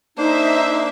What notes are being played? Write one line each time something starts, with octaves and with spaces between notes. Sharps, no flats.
A#3 D4 D#4 C5 E5